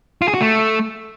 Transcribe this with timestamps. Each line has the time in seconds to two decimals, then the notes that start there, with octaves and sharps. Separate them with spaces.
0.22 F4
0.28 G#4
0.34 F#4
0.41 A3